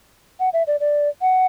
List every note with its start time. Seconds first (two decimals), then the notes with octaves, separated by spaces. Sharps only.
0.40 F#5
0.53 E5
0.67 D5
0.80 D5
1.22 F#5